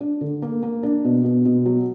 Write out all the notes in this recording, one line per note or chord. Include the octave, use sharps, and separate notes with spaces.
D4
D3
A#3
A#3
D4
B2
B2
B2
F#3